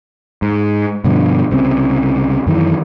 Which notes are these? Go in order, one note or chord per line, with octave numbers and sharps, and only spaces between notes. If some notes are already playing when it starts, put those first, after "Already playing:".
G#2
G2 B2 D3 F3
C2 C#3 E3 C4
F#2 D#3 E3